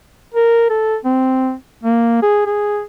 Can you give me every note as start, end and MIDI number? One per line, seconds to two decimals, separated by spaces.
0.34 0.69 70
0.69 0.97 69
1.05 1.53 60
1.83 2.22 58
2.22 2.43 68
2.46 2.82 68